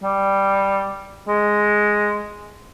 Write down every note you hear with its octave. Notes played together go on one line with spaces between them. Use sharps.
G3
G#3